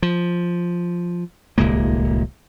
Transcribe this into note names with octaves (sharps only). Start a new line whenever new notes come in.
F3
D1 C2 G#3 A#3